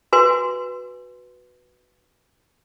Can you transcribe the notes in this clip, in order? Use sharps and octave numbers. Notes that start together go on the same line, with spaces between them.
F#4 B4 G#5 C6